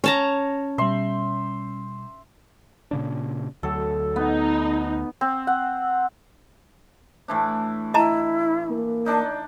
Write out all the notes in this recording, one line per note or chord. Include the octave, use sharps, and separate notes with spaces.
C#4 C#5 A5 A#5
B2 G3 E5 C6
A#2 C#3 D4
D2 F#3 A4
B3 D#4
C4
F#5
A2 E3 D4
E4 D#5 A5 A#5
A#3
D4 D#4 D5